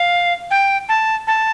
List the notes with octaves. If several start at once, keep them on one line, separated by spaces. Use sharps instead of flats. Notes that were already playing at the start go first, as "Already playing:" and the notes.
Already playing: F5
G5
A5
A5